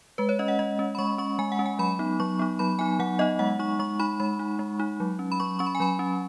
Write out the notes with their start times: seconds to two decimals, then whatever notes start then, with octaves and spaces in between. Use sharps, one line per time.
0.18 G#3 B4
0.29 C#5
0.39 C#4 D#5
0.48 F#5
0.59 G#3 D#5
0.79 C#4
0.95 B5
0.99 G#3 C#6
1.18 C#4 C#6
1.39 G#3 G#5
1.52 F#5
1.59 C#4
1.66 G#5
1.79 F#3 B5
1.99 B3 D#4
2.20 F#3 C#6
2.39 B3 D#4
2.59 F#3 B5
2.79 B3 D#4 G#5
2.99 F#3 F#5
3.19 B3 D#4 D#5
3.39 G#3 F#5
3.59 D#4 C#6
3.79 G#3 C#6
3.99 D#4 B5
4.20 G#3 B5
4.39 D#4
4.59 G#3
4.80 D#4
5.00 F#3
5.19 C#4
5.32 B5
5.40 F#3 C#6
5.59 C#4 C#6
5.66 B5
5.75 G#5
5.80 F#3 B5
5.99 C#4